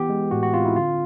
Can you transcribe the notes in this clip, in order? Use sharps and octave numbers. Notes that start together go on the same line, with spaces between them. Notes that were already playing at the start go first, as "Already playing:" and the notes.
Already playing: E3 B3 G4
G#3
A2 F#4
F#4
C4 F4
E4
D3 F4